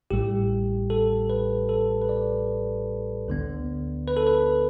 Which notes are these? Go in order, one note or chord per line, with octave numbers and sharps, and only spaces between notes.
A1 A2 G3 G4
A4
B4
A4
B4
D5
D2 D3 B3
B4
A4
B4